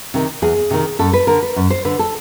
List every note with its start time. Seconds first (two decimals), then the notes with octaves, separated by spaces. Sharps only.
0.14 C3 D#3
0.42 E2 G#4
0.71 C3 D#3
0.99 F#2 A4
1.13 B4
1.27 D3 A#4
1.42 B4
1.56 F#2
1.70 C5
1.85 D3 B4
1.99 A4